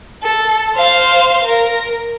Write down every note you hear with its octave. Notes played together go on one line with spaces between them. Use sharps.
A4
C5 F5
A#4